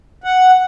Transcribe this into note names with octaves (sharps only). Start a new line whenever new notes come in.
F#5